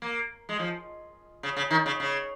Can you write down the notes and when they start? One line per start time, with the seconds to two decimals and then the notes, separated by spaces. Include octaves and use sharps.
0.02 A#3
0.49 G#3
0.59 F3
1.43 C#3
1.56 C#3
1.71 D#3
1.86 C#3
2.00 C#3